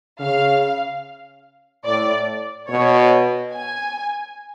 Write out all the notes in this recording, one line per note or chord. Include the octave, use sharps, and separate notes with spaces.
C#3 F5
A2 D5
B2 C#5
G#5